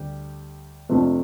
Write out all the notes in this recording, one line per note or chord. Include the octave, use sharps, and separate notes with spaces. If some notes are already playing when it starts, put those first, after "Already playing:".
Already playing: D2 G3 G4
F2 C3 F3 A3 D4